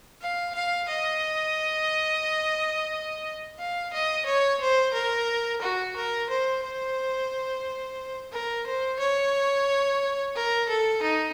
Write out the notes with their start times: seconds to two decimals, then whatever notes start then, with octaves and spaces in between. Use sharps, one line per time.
0.21 F5
0.54 F5
0.88 D#5
3.59 F5
3.92 D#5
4.26 C#5
4.61 C5
4.94 A#4
5.62 F#4
5.96 A#4
6.30 C5
6.63 C5
8.32 A#4
8.66 C5
8.99 C#5
10.35 A#4
10.69 A4
11.02 D#4